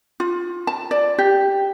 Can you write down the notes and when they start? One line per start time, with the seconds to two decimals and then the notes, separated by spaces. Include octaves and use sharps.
0.20 F4
0.67 A5
0.91 D5
1.18 G4